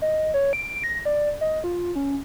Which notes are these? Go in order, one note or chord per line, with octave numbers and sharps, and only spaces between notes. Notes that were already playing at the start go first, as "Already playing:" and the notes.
D#5
C#5
D7
A#6
D5
D#5
F4
C#4